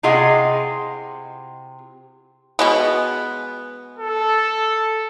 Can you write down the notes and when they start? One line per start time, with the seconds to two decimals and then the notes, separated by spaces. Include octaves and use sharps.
0.03 C3 E4 F4 G#4 D#5 F#5
2.59 B2 G#3 B3
3.99 A4